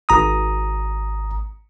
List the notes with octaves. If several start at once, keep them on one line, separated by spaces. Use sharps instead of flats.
G#1 A#5 D#6